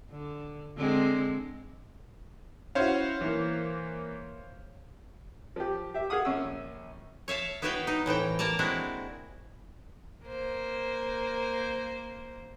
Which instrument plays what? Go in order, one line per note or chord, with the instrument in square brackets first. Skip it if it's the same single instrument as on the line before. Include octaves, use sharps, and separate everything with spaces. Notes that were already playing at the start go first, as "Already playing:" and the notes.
[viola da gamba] D3
D3 G#3 C4
[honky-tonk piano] C#4 E4 F#4 [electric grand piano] C5 C#5 F5
[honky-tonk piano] E3 A#3
[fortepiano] F3 G4
G4 E5
G#4 F5 F#5 D#6
A#1 C#4 E6
[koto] C#5 E5 F5 A5
B3 E4 F#4 B4 F5 G5
D#4
A2 E3 C4 G5
A#3 D5 A5 A#5
G#3 C4 D4 E4 F#4
[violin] A#3 C5